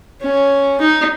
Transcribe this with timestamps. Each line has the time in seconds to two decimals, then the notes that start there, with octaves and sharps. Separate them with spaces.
0.22 C#4
0.81 D#4